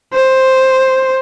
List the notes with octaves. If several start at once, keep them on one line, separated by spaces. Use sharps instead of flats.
C5